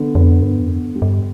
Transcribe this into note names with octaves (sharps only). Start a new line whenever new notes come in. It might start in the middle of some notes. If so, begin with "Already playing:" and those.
Already playing: D3 B3
F2 B3
G2 B3
F2
B3
G3
G2